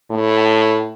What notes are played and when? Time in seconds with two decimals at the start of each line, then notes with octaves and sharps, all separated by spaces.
0.11 A2